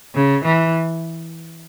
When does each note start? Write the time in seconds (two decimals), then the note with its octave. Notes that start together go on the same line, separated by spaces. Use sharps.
0.15 C#3
0.44 E3